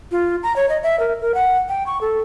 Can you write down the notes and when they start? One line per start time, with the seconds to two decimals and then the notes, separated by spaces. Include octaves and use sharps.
0.12 F4
0.43 A#5
0.56 C#5
0.69 D#5
0.83 E5
1.00 A#4
1.21 A#4
1.34 F#5
1.69 G5
1.87 C#6
2.01 A4